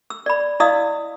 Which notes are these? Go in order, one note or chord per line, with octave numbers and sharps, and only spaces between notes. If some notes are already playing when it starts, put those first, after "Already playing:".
E6
D5 B5
E4 D5 D#5 F5 D#6 E6